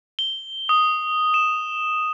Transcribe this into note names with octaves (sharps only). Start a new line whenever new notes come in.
G7
D#6
E7